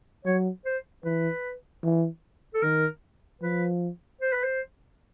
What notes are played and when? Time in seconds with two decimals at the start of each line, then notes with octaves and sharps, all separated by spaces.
0.25 F#3 C#5
0.65 C5
1.04 E3 B4
1.83 E3
2.54 A4
2.62 D#3 A#4
3.41 F3 B4
4.21 C5
4.33 B4
4.44 C5